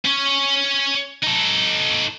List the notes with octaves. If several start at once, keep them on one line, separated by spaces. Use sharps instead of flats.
C#4 C#5
D#4 A4